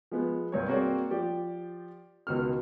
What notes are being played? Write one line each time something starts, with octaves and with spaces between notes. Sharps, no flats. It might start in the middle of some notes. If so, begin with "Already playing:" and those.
F3 G#3 B3
C2 G2 C#5
A#3 C4 F#4 G#4 C#5 D5
F3 G4 D5
C#2 B2 D#3 F#4 F6